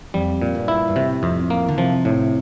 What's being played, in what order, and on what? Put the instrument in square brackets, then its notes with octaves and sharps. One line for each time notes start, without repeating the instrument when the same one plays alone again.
[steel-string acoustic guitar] F2 [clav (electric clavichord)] G3
[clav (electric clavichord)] A#2
[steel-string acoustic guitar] G2
[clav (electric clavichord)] E4
[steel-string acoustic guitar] G2
[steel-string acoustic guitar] A2 [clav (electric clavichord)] C3
[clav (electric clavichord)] F2
A#3
[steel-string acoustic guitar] D3
[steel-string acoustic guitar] C3 [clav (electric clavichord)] F3
[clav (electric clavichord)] A2